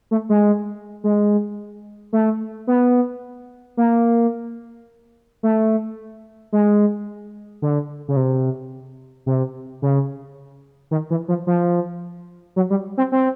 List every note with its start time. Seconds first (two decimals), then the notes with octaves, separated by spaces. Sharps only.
0.11 A3
0.29 G#3
1.04 G#3
2.13 A3
2.67 B3
3.77 A#3
5.43 A3
6.53 G#3
7.62 D3
8.08 C#3
8.16 C3
9.26 C3
9.82 C#3
10.91 D#3
11.10 E3
11.28 F3
11.47 F3
12.56 F#3
12.70 G3
12.97 C4
13.12 C4